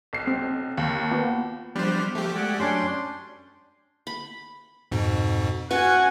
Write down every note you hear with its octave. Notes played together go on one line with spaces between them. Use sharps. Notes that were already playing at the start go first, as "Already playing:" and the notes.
B1 C7
C4
D#2
A#3 B3 F4
F3 G3 B3 D4 C5
F3 A3 G4
G#3 D5 F#5
F#2 C#4 D4 G5 C6
B5
F2 G#2 B2
C#4 F#4 B4 F#5 G#5